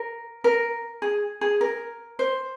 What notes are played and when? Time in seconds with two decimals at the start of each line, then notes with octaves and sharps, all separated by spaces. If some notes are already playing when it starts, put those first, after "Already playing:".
Already playing: A#4
0.44 A#4
1.02 G#4
1.41 G#4
1.61 A#4
2.19 C5